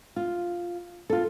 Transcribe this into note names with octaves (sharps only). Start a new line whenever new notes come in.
F4
F4 A4